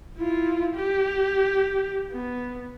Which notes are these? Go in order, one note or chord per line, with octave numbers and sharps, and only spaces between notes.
E4 F4
G4
B3